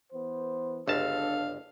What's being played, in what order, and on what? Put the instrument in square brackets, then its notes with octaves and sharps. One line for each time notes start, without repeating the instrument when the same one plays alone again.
[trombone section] E3 B3 C5
[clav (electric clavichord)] G1 C#2 A5 [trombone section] D4 [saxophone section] A4 F5